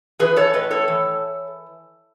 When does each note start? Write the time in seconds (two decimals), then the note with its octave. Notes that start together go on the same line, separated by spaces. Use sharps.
0.19 E3 G#4 B4
0.36 A4 C#5
0.53 A2 B4 D#5
0.71 A4 C#5
0.88 E3